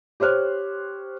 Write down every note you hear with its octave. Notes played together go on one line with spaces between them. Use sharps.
G4 C5 C#5 F6 F#6